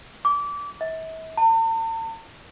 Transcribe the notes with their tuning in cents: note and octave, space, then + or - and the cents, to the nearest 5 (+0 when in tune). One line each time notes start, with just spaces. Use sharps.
D6 -25
E5 -40
A5 +45